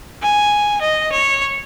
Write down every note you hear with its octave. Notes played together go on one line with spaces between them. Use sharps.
G#5
D#5
C#5